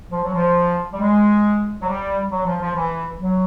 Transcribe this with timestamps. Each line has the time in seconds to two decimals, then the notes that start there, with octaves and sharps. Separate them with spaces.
0.11 F3
0.24 F#3
0.34 F3
0.92 G3
1.00 G#3
1.81 F#3
1.87 G3
2.31 F#3
2.46 F3
2.61 F3
2.74 E3
3.19 F#3